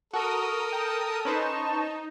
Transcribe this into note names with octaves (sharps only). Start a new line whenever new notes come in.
F#4 A4 A#4 D#6
G5 A#5
C#4 D#4 B4 C5 A5 C#6